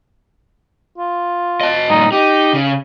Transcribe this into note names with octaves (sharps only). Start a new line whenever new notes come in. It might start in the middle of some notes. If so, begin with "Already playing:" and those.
F4
D#5 A5
G2 A#2 D#4
D#4 G4
C#3